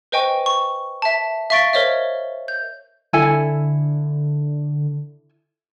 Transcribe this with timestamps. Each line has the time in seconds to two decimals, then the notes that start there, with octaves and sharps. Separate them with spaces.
0.12 B4 C5 D#5 G5 G#5 C#6
0.46 C#6
1.02 E5 A5
1.50 E5 F5 C#6 A6 D7 G7
1.73 A#4 C5 C#5 D#5 E5
2.48 G6
3.13 D3 E4 A4 G#5